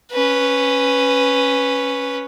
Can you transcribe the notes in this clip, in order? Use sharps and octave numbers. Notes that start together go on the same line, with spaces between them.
C#4 B4